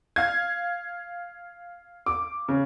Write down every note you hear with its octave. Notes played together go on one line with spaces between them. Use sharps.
F5 G#6
D6
C#3